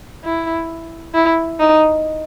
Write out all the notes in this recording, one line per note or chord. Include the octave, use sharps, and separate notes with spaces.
E4
E4
D#4